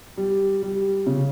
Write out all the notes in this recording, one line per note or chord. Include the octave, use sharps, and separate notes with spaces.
G3
G3
C#3